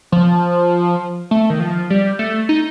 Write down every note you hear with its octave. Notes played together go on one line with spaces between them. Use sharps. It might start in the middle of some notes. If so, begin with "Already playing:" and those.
F3
A3
D#3
F3
G3
A3
D#4